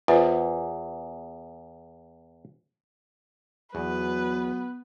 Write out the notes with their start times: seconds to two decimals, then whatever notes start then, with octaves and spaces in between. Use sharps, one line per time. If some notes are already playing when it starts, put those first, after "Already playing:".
0.08 E2 F4 B4 C5
3.75 E2 F#3 B3 B4